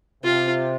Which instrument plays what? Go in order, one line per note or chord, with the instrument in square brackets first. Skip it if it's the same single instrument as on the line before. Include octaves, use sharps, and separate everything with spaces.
[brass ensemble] C3 [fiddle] F4